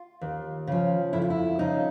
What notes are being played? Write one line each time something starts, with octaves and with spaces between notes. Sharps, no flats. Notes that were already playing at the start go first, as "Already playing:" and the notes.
Already playing: F4
D#2
C#3 F3
F2 E4
F4
E4
C#3 F3 D#4